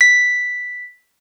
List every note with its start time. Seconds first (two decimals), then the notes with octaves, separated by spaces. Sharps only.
0.01 B6